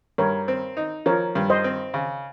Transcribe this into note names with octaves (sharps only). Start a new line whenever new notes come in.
G2 A#4 C#5
C4
D#4
F3 A#4 C#5
G2
C5 D#5
C4
C#3